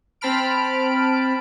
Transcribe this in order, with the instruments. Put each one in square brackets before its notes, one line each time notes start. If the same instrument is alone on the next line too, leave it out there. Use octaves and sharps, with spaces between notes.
[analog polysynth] C4 C5 A5 B5 F6 D7